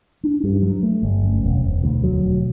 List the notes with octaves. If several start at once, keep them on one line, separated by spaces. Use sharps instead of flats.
D4
G2
F#3
A3
G1
F#2
E1
E1
D2
F#3
E1